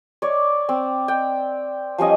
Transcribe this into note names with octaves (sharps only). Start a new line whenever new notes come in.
C#5 D5
C4
G5
F3 G3 C#4 D#5